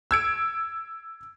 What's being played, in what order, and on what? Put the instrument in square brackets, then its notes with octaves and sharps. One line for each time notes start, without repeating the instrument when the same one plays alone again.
[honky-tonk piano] E6 G#6 D7